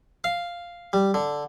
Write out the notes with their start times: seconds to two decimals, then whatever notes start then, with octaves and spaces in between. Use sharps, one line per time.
0.24 F5
0.93 G3
1.14 D3